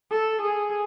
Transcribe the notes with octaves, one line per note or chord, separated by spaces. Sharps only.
A4
G#4